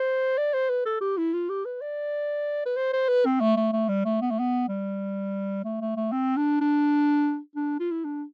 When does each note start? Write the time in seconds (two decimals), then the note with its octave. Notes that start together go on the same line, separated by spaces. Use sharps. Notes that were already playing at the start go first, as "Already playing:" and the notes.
Already playing: C5
0.38 D5
0.54 C5
0.69 B4
0.86 A4
1.01 G4
1.17 E4
1.33 F4
1.49 G4
1.65 B4
1.81 D5
2.65 B4
2.77 C5
2.93 C5
3.09 B4
3.25 C4
3.40 A3
3.57 A3
3.73 A3
3.89 G3
4.05 A3
4.21 B3
4.31 A3
4.39 B3
4.68 G3
5.64 A3
5.81 A3
5.97 A3
6.12 C4
6.36 D4
6.61 D4
7.56 D4
7.80 F4
7.91 E4
8.05 D4